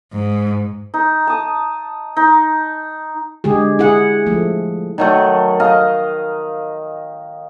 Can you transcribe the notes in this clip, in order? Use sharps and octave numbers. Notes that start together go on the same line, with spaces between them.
G#2
D#4
A5 D#6
D#4
D3 G#3 G4 G#4
E4 G#4 F#5
F3 A3
D#3 F#3 A3
D#5 F5 A#5